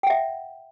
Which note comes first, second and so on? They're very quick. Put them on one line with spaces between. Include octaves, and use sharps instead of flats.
G5 F#5 E5